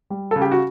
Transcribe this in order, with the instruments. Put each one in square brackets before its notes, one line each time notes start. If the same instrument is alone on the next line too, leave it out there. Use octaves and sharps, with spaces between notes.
[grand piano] G3
C#3 A4
G4
F#4